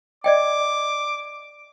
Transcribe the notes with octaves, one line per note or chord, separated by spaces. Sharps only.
D5 D#5 G5 D6